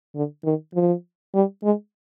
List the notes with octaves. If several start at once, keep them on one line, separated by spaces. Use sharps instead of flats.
D3
D#3
F3
G3
G#3